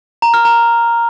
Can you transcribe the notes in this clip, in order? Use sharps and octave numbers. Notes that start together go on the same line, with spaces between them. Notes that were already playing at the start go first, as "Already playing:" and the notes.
A#5
F6
A#5